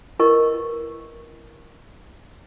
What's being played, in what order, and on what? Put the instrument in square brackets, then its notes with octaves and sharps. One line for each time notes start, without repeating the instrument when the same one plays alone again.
[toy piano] E4 A#4 B4 D#5 C#6